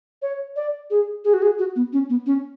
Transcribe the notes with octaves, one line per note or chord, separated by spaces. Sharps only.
C#5
D5
G#4
G#4
F#4
G#4
F#4
B3
C#4
B3
C#4